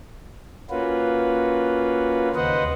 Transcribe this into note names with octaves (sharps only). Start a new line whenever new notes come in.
A#3 C#4 F4 F#4 B4
D#2 C#3 B4 C5 D#5 F#5